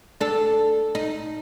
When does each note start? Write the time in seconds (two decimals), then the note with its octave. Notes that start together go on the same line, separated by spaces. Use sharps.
0.21 D4 A4
0.95 D#4